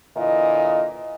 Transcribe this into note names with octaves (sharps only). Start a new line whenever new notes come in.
A#2 D3 E3 D#5